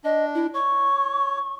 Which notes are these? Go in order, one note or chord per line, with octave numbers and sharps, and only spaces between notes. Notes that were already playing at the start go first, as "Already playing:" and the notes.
D4 D#5
E4
C#5 C#6